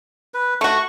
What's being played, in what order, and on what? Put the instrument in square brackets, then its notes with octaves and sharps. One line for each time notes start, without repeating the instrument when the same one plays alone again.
[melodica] B4
[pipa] A3 F#4 [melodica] C#6